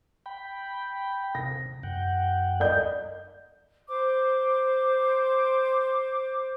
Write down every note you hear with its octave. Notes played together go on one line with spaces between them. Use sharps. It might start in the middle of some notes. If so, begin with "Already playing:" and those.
G5 B5
C3 A#6
F#2 F#5 G5
D5 D#5 G6
C5 D6